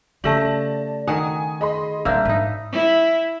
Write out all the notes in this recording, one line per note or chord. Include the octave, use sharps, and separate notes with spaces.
C#3 A3 G4 D5 A5 A#6 F#7
D#3 F#5 G#5 D#6
G#4 D#5 B5 C6
A#2 G3 A#3 C4 D4 E5 E6
G#2 D#4 B4
E4